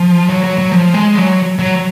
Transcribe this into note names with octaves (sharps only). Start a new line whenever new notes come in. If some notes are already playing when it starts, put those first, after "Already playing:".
Already playing: F3
F#3
F#3
F#3
F3
G#3
F#3
F#3